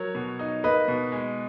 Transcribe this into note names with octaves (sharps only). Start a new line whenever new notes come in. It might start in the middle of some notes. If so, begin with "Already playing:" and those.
Already playing: F#3 A#4 C#5
B2
D#4
A#3 B4 D#5
B2
G#3